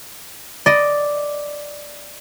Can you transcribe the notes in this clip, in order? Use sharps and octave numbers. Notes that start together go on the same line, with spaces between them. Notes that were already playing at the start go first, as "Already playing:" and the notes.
D5 D#5